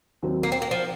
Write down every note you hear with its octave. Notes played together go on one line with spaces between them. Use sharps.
D#2 D#3 F#3 C4
A#3
C4
A#3
F3